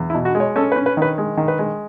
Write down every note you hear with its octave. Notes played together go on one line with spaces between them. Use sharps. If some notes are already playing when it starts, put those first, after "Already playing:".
Already playing: E2
E4
B2
F#4
G#3
C#5
C#4 A4
B4
C#4
B4
D#3 B4
G#3
D#3
B4
G#3